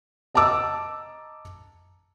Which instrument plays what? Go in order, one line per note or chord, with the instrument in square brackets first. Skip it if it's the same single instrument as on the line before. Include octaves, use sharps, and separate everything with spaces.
[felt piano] D#5 A5 A#5 D6 E6